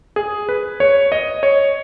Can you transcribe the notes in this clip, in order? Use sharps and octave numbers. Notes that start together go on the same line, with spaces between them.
G#4
B4
C#5
D#5
C#5